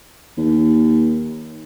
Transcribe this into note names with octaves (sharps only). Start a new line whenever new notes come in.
D#2